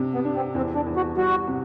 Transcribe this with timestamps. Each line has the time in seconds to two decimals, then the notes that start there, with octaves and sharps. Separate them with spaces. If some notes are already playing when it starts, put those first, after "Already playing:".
Already playing: C3 D4
0.14 B3
0.25 D4
0.35 C4
0.55 E2 C4
0.75 D4
0.86 E2
0.96 F#4
1.16 G3 F#4
1.47 C3